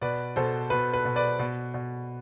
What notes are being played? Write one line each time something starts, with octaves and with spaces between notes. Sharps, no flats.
B2 B4 D5
B2 A4 C5
B2 B4
B4
B2
B4 D5
B2
B2